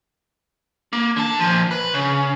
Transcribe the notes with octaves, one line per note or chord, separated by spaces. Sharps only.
A#3
D3 A5
A#2 F3
B4
C#3